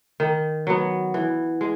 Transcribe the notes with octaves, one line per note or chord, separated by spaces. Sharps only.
D#3
F#3 B3
E3
G#3